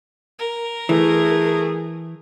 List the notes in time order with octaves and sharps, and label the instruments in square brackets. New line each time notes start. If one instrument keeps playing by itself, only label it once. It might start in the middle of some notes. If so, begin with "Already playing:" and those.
[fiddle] A#4
[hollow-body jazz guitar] E3 [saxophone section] A3 G#4